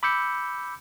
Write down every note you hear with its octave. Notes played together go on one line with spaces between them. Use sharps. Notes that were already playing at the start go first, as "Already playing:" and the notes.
B5 D6 E6 G6 C#7